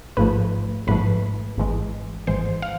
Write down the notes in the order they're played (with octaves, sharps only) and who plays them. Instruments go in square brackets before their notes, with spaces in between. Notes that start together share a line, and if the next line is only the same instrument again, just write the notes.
[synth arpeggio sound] A1 G#2 F3 A3 B4
A1 G#2 F3 A3 B4
G#1 G#2 E3 G#3
G#1 G#2 E3 G#3 C5
F5